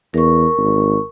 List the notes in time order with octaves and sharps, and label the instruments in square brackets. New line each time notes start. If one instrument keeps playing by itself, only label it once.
[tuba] E2 [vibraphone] A#4 C#6
[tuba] G#1